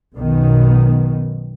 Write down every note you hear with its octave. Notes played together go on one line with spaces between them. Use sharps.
B1 F#2 B2 D#3 B3